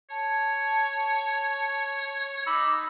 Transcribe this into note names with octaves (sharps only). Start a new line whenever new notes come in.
C#5 A5
D#4 B5 D6 E6